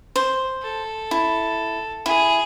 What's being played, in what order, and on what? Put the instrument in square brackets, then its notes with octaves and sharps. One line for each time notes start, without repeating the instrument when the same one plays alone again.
[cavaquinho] C5
[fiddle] A4
[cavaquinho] E4
[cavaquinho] E4 [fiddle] G#4